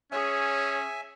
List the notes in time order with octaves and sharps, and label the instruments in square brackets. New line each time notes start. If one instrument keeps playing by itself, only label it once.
[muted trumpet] C#4 [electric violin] G#4 [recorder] C#5 [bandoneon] E5 G#5